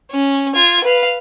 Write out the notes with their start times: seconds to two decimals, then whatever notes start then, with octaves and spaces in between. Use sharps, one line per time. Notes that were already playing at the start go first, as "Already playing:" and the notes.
0.11 C#4
0.55 F4 G#6
0.84 B4 F5